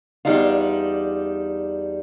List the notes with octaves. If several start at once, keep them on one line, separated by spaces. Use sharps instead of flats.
E2 G3 D4 D#4 F4